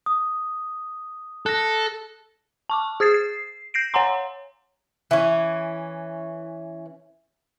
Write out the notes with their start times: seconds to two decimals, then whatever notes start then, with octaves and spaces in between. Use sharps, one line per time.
0.06 D#6
1.46 A4 F#6 A#6
2.69 A5 C#6 D6
3.00 G#4 D#6 G#6 A6 C7
3.14 C7
3.74 G6 A#6 C7 D7
3.94 C#5 F#5 G#5 A#5 C6
5.11 E3 C#4